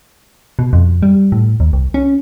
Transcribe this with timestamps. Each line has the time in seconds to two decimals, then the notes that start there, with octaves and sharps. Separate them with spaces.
0.59 B2
0.73 F2
1.03 G3
1.32 A2
1.60 D#2
1.73 C2
1.94 C#4